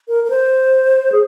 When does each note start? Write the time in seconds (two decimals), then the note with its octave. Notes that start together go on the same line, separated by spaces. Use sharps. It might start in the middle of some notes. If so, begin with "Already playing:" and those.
0.08 A#4
0.24 A#4
0.30 C5
1.12 G#4